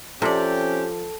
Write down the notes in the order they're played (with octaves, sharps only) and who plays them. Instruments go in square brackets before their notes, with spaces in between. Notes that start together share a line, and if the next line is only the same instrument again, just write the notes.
[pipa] C3 D5 [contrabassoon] F3 [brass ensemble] C4 C#4 G4 [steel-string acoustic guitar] A4